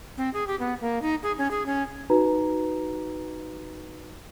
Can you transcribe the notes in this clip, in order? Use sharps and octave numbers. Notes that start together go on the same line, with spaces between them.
C4
G#4
G4
B3
A#3
D#4
G#4
C#4
G#4
C#4
D#4 F#4 B4 A#5